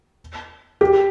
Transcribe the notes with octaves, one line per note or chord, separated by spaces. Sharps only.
G4